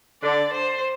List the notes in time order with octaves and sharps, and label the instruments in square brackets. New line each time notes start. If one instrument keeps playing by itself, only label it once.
[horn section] D3 [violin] D5
[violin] C5